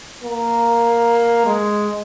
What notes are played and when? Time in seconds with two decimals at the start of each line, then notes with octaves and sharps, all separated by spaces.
0.24 A#3
1.46 G#3